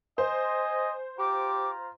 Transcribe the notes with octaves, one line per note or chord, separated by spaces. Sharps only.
C5 D#5 G#5
F4 G4 A#5 D6